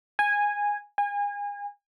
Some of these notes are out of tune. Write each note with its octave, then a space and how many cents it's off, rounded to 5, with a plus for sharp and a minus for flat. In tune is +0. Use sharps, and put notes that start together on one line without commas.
G#5 -10
G#5 -30